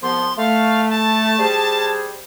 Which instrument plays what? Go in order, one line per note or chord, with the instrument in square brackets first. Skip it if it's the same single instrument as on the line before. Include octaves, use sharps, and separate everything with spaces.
[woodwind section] C2 F3 B3 [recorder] C6
[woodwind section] A3 [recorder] F5
[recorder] A5
[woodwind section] G3 G#4 C5